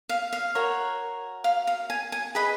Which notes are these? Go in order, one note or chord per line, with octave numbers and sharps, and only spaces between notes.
F5
F5
F#4 A#4 C#5
F5
F5
G#5
G#5
G#4 B4 D#5 B5